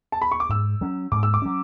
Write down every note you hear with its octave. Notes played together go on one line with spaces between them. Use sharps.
A5
B5
C#6
D6
G#2 E6
F#3 C#4
G#2 D6
E6
D6
F#3 C#4